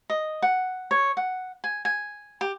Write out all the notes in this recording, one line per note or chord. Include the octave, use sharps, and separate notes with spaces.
D#5
F#5
C#5
F#5
G#5
G#5
G4